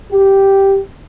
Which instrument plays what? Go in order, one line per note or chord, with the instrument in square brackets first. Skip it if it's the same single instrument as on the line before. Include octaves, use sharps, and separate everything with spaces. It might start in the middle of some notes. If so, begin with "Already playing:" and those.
[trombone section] G4